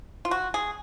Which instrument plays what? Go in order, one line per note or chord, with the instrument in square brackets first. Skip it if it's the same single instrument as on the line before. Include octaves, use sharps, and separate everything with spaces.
[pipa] F4
F#4
G#4